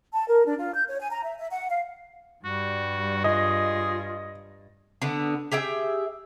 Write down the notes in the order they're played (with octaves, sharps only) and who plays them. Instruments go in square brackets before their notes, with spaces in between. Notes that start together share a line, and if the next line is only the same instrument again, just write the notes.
[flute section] A5
A#4
D4
F4
G6
C#5
G#5
A#5
E5
E5
F#5
F5
[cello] G2 [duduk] G3 [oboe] F#4
[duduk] F4 [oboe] G#4 [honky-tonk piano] D#5
[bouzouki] D3 B3
G4 G#4 E5 G5